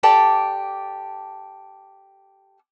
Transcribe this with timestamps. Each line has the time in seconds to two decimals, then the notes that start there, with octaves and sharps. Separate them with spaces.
0.03 G4 A4 D5 A5